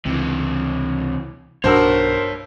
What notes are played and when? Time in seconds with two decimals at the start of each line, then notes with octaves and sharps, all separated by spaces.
0.06 C#2 C3 E3
1.64 B1 G2 F#4 A#4 C5 C#5 A5 E6